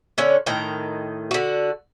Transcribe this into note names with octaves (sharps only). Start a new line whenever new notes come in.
D3 C#4 C#5
A2 D#3 G5 A#5
D3 F#4